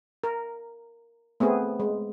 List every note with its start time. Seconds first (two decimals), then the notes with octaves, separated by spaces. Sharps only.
0.24 A#4
1.40 A3 B3 C4 G#4
1.80 G#3